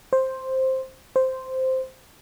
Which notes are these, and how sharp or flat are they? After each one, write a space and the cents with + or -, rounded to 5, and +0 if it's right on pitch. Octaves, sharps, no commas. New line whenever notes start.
C5 +5
C5 -5